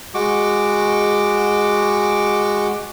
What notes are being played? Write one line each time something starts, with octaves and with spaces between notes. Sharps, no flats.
G#3 F#4 D6